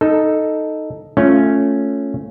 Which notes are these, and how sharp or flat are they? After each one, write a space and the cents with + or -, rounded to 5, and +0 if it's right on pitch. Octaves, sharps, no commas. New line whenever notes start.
D#4 +0 A4 +0
A3 +0 C#4 +0 F4 +0